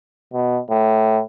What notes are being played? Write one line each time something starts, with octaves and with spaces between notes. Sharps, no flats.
B2
A2